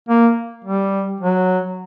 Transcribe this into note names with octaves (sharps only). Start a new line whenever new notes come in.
A#3
G3
F#3